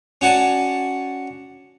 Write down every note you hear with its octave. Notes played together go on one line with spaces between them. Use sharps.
C#4 F#4 D5 F#5 G#5 A5